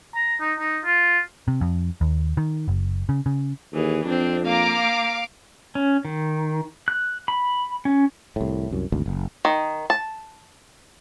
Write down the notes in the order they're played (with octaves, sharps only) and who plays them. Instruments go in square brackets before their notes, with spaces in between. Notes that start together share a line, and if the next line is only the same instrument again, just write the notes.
[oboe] A#5
D#4
D#4
F4
[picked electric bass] C3
F2
D#2
D#3
F#1
C#3
C#3
[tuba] D#2 [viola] E3 G#4
[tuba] F2 [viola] C4 D4
[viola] A#3 A#5 [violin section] F5 D6
[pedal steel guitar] C#4
D#3
F#6
B5
C#4
[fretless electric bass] C2 A2
C2 F#2
G#1 D2
F#1
[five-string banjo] D#3
A5